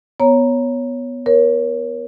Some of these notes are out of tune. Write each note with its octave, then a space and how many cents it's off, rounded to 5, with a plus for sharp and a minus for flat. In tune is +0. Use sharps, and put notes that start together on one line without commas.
B3 +0 C#5 +0 A#5 +0
A#4 +35 C#5 +0